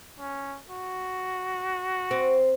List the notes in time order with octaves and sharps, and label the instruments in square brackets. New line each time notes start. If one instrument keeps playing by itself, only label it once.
[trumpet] C#4
F#4
[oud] C4